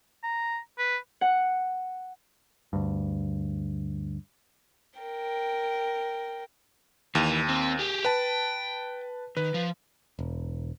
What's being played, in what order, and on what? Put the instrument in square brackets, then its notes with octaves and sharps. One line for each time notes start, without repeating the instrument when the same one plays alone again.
[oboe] A#5
B4
[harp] F#5
[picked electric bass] D2 G2
[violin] A#4 G5
[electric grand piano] D#2 [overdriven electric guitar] E3
[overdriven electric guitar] C4
G4 G#4
[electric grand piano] B4 A5 [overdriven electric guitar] G5
[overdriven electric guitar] D#3 [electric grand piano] B4
[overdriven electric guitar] F3
[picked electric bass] E1